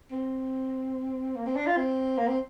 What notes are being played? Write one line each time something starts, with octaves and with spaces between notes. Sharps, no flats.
C4
A#3
C4
D4
F4
C4
A#3
C4